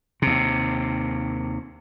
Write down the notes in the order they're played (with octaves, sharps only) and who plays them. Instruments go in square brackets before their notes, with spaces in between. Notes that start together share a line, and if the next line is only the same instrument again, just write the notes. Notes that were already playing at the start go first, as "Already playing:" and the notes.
[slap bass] D#2 C3